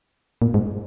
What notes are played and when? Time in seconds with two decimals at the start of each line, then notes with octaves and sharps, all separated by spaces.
0.42 A#2
0.54 G#2